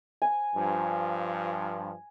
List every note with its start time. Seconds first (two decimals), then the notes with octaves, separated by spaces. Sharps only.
0.22 G#5
0.56 G2 F3